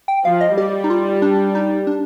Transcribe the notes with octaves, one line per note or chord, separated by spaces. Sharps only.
G5
F3 F5
D#5
G3 G4
D#4
F4
D4
D#4
D4